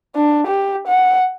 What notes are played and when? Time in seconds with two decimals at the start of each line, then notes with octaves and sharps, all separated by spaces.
0.16 D4
0.47 G4
0.87 F#5